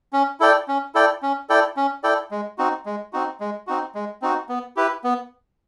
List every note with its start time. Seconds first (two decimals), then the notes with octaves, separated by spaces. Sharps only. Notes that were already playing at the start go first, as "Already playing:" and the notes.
0.13 C#4
0.40 E4 A4 D5 G5
0.68 C#4
0.95 E4 A4 D5 G5
1.23 C#4
1.49 E4 A4 D5 G5
1.77 C#4
2.03 E4 A4 D5 G5
2.31 G#3
2.58 C4 D#4 F#4
2.86 G#3
3.13 C4 D#4 F#4
3.40 G#3
3.67 C4 D#4 F#4
3.95 G#3
4.22 C4 D#4 F#4
4.49 B3
4.76 E4 G4 B4
5.04 B3